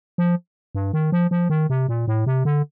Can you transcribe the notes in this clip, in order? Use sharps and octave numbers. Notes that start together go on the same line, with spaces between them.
F3
G2
D#3
F3
F3
D#3
C3
A#2
A2
C3
D3